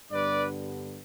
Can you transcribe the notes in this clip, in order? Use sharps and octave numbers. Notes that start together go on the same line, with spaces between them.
G2 D3 G3 B3 B4 D5